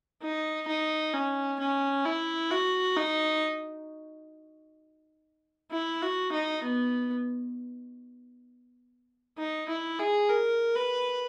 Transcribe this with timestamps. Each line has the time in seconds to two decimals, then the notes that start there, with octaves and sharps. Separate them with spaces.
0.22 D#4
0.68 D#4
1.14 C#4
1.59 C#4
2.05 E4
2.51 F#4
2.96 D#4
5.71 E4
6.02 F#4
6.32 D#4
6.63 B3
9.38 D#4
9.69 E4
9.99 G#4
10.29 A#4
10.76 B4